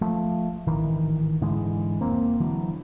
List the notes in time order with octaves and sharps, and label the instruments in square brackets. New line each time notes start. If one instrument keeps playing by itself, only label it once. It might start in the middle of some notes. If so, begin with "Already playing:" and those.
[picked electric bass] F3 A3
D1 G#1 D#3 E3
G#2 D3 E3 G#3
E1 A#3 C4
D3 E3 F#3